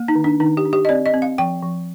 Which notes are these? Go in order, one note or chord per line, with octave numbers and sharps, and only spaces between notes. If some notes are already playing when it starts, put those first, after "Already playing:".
Already playing: A#3
D#4
D#3
D4
D#3 D#4
G4
D4
G4
D#5
C4 D5
D#5
C4
F5
F3 G5
F3